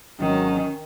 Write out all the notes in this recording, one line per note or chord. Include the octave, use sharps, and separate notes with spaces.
G#1 D#3 F#3 C#4